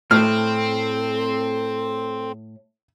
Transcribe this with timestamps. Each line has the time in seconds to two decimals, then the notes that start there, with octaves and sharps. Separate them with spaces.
0.11 A2 C4 A4 F6